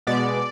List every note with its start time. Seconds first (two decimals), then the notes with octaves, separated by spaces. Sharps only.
0.07 B2 G#3 B3 D5